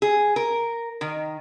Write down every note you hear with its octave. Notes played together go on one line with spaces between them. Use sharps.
G#4
A#4
D#3